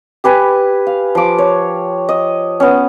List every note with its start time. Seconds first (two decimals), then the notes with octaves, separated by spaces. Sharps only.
0.24 G4 B4 G#5 B5
0.87 F5
1.15 F3 D6
1.38 C#5
2.09 D#5
2.60 B3 C#4